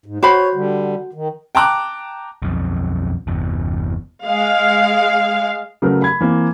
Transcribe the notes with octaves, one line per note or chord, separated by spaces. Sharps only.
G#2
F#4 C5 C#5 B5
D3 G3
D#3
G5 A5 A#5 D6 F#6
B1 F2
G1 E2
G#3 F5
C#3 F#3 A3 A#4 B4
B5 G#6
E3 A#3 C4